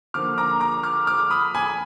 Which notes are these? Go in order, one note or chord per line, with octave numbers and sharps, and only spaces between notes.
D3 F3 A#3 D6 F6
A#5 D6
A#5 D6
D6 F6
D6 F6
B5 D#6
G#5 B5